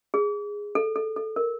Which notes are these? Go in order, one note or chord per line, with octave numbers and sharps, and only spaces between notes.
G#4
A4
A4
A4
A#4